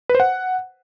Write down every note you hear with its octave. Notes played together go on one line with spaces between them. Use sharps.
B4
C5
F#5